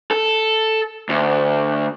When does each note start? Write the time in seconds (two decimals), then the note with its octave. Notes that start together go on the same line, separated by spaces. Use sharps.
0.11 A4
1.09 D2